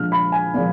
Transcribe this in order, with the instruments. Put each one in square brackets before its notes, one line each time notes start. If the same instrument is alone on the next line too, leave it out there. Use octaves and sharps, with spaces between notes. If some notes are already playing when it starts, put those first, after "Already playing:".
Already playing: [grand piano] A#2 F3 G#3 D4 F6
B5
G#5
A#2 F3 G#3